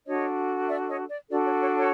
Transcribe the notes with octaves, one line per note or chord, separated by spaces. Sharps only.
D4 F#4 A4 C#5 D#5
D5 E5
C#5 D#5
D5
D4 F#4 A4 D5
C#5
C#5
C#5